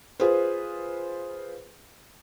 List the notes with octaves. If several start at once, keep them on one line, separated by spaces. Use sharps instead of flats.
F4 G#4 B4 C5